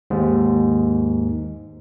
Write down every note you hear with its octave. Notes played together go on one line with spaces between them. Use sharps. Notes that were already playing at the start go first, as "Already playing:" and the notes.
D#2 G#2